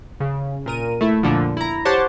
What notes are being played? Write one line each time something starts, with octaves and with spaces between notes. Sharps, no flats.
C#3
A#2 A#4 D#7
A3 E4
F2 A#2 D3 F3
E4 A#5
G4 C5 C#5 F#5 A5 D6